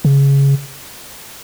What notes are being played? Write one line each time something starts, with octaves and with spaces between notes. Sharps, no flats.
C#3